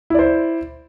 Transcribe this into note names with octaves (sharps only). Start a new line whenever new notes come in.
E4 C5 D5